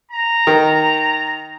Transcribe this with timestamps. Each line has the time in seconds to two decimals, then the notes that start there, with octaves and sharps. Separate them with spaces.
0.11 A#5
0.47 D#3